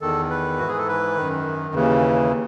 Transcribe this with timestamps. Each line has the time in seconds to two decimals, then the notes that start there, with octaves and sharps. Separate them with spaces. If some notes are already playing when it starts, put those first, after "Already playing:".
0.01 E2 D#3 A4
0.30 B4
0.59 G#2 E3 F#4
0.68 G#4
0.78 A4
0.88 B4
1.17 F#2 D#3
1.74 D#2 C#3 E3